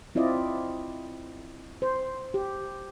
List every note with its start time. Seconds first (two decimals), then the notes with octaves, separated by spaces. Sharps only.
0.15 C4 E4 F4 D5 D#5
1.82 C5
2.34 G4